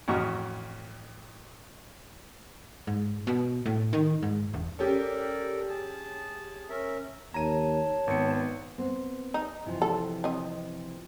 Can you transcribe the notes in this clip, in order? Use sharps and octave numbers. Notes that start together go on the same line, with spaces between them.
A1 F2 F#4 A#5 C#6 F6
G#2
B2
A2
D#3
G#2
E1
C#4 G4 A4 A#4 D5
G#4 A5
C#4 A#4 E5
D#2 C#5 A5 A#5 D#7
G#1 B3 C#7
B3 C4
D#4
C3 E3 F3
A4
C4 D#5